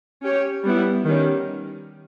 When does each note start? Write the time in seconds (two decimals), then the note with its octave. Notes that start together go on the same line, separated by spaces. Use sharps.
0.22 C#4 G4 C#5
0.64 G3 B3 E4
1.04 D#3 G3 C#4